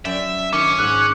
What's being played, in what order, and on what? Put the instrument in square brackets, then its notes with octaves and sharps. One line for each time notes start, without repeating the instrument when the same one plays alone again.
[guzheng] F#2 D5 G5 [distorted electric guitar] E5
[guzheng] D#3 D#4 [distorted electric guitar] C#4 [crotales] D6
[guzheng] G#2 [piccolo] F#6